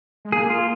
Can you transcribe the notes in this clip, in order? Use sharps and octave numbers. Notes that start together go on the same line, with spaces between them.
G#3
A#3 G#4
F4